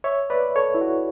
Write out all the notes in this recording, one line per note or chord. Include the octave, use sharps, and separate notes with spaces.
C#5 E5
B4 D5
A4 C#5
E4
F#4